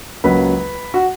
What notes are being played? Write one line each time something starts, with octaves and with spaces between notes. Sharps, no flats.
C#2 C#3 F#3 A#3 B4
F#4